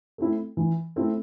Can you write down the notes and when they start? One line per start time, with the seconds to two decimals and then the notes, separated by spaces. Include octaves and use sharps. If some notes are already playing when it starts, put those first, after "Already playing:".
0.18 A3 C4 E4
0.57 E3
0.96 A3 C4 E4